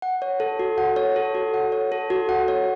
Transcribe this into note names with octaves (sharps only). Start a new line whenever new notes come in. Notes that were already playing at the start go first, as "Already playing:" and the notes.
F#5
C#5
A4
F#4
F#5
C#5
A4
F#4
F#5
C#5
A4
F#4
F#5
C#5